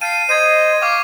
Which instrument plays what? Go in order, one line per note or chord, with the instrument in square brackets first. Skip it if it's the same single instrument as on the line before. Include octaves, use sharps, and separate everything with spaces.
[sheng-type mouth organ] F5 G5 A5 [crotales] C7 D#7
[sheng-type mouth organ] C5 D#5 [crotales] G#6 C7 D#7
[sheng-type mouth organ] F5 G5 [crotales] C#6 D6